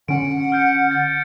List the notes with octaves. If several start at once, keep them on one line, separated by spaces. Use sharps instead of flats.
D3 C#4 F#5 D7
F6 G6 C#7
G6 A6